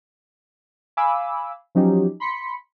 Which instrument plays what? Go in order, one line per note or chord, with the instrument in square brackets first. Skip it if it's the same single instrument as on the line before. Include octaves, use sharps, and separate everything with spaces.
[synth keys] F5 G#5 B5 D6 E6
F3 F#3 C#4 D#4 G4
B5 C6 B6 C#7